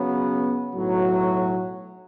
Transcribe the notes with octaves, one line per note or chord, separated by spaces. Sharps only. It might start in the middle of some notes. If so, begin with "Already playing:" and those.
Already playing: C#3 F#3 B3
B1 A2 F#3